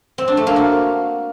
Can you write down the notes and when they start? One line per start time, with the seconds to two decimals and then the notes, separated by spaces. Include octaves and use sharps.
0.18 C4
0.28 D4
0.37 A3
0.47 A#3
0.56 F#4